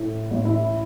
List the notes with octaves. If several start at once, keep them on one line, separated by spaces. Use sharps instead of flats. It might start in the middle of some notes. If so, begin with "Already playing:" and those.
Already playing: A2
A1
E4